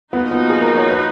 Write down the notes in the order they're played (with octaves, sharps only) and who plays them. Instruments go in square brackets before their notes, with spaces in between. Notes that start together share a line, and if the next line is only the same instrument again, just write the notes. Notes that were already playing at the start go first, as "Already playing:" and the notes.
[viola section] F3 A#3 D#4 F#4 [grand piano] B3
[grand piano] B3
G#4
A#4
C#5
B4